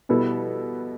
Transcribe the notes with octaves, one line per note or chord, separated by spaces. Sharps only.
B2 G3 B3 E4 A4